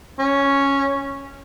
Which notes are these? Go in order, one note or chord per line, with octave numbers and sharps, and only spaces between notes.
C#4